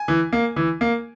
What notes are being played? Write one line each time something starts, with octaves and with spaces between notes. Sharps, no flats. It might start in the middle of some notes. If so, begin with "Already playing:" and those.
Already playing: G#5
E3
A#3
E3
A#3